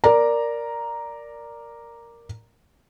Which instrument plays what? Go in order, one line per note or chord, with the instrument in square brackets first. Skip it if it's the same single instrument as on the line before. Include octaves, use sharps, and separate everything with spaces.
[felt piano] A#4 D5 A#5